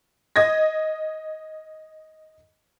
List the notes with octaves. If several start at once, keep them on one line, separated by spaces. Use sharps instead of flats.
D#5 G#6 A#6